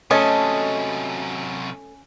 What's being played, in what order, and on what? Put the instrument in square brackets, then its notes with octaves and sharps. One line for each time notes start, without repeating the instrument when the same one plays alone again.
[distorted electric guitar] C3 F#3 [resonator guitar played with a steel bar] A3 A4 [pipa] C#4 [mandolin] D#5